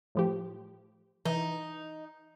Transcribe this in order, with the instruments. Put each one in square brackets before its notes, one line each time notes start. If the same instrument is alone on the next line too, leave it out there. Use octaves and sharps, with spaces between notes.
[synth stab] A2 F3 G4
[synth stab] E3 [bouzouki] D#4